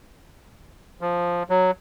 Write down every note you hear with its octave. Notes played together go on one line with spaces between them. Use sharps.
F3
F#3